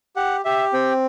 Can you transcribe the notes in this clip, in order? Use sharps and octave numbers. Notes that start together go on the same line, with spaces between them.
G4 F#5
G4 E5
C4 G5